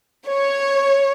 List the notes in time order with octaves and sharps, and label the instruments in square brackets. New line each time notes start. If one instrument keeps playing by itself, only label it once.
[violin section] C#5